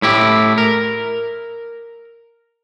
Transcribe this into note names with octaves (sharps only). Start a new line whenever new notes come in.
A2 E4 G4
A#4